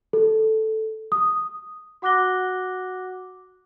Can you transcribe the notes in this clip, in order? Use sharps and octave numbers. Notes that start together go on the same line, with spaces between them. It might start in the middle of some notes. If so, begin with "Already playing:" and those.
A4
D#6
F#4 F#5 D6 F#6 A#6 G7